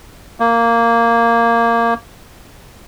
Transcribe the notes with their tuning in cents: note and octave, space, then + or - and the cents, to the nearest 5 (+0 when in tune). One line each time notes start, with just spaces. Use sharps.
A#3 -10